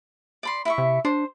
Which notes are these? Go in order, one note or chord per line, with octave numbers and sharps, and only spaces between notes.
D5 B5 C6
E4 E5 C#6
C3
D4 C5